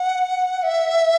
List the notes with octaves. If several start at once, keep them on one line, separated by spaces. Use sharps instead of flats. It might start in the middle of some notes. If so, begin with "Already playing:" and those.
Already playing: F#5
E5